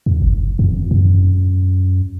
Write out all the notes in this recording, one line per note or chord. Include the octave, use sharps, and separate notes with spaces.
E2
F#1
F2
F#2